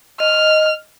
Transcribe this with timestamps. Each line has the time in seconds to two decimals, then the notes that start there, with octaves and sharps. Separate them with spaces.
0.20 D#5 F6